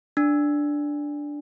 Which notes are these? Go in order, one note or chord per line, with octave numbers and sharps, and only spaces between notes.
D4